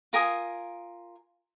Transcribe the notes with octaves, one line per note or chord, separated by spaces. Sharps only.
F4 A#4 G#5 D#6